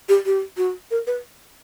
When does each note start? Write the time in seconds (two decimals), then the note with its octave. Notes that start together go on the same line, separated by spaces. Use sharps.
0.09 G4
0.25 G4
0.57 F#4
0.91 A#4
1.07 B4